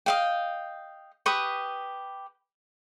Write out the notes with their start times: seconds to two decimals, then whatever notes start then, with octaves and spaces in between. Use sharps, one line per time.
0.06 D#5 F5 G5
1.26 G4 B4 C#6 D#6